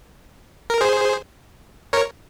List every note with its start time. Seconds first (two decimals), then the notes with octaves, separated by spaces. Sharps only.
0.70 A#4
0.81 G#4 C5
1.93 A#4 C#5